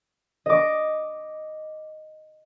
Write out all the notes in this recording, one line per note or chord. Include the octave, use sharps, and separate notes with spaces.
D#5 D6